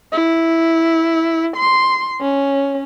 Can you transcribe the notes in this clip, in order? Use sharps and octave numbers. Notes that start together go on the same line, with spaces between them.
E4
C6
C#4